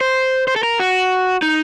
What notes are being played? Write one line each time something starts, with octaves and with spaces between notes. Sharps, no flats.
C5
C5
A4
A#4
F#4
D#4